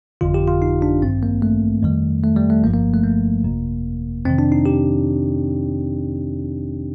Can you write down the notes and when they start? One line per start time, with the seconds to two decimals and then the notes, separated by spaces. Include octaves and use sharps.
0.21 G1 F2 D3 F4
0.34 G4
0.48 F4
0.62 D#4
0.82 D4
1.02 A1 G2 D#3 C4
1.23 A#3
1.42 A3
1.83 F2 D#3 G3
2.23 A3
2.37 G3
2.50 A3
2.63 G1 G2 F3 A#3
2.74 A#3
2.94 A3
3.04 A#3
3.44 G1 F2 C3
4.25 F2 C3 D#3 C4
4.39 D4
4.52 D#4
4.66 G4